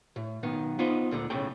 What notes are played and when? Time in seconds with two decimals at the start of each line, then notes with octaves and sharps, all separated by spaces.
0.16 A2
0.43 B1 D#3 B3
0.79 B3 D#4 F4 C5 D#5
1.11 D2 A#2 D3
1.30 B1 A2 C#3 G5